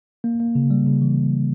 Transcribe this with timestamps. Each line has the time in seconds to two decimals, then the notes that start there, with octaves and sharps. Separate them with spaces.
0.24 A#3
0.40 A#3
0.55 C#3
0.71 G3
0.86 C#3
1.02 E3